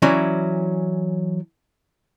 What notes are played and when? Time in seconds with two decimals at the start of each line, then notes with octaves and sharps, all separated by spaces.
0.02 E3 F#3 C#4 E4 D5